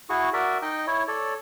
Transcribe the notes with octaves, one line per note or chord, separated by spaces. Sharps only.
E4 F#4 G#4 C#6
F#4 A#4 D5 E5
D#4 D#5 G5
E4 C#5
A4 C#5 D5